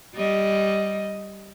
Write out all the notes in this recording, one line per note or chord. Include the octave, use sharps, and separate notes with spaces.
G3 D#5